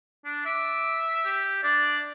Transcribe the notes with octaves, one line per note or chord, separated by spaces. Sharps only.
D4
E5 D6
G4
D4 D5